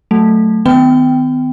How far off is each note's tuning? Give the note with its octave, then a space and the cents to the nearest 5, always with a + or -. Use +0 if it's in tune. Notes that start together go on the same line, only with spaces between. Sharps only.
F#3 +0 A3 +0
D#3 +0 B3 +45 G5 -5